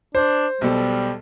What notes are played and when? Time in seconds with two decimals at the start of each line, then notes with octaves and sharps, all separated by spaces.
0.15 D4 C5
0.61 B1 B2 G3 A4